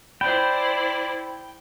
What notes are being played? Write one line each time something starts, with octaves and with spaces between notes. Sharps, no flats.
E4 C5 D5 G5 B5